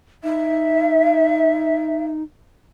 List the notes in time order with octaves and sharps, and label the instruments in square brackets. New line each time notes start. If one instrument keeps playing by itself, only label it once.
[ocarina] D#4 [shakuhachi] E5